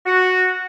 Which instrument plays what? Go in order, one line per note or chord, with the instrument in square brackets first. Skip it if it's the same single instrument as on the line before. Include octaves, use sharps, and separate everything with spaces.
[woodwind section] F#4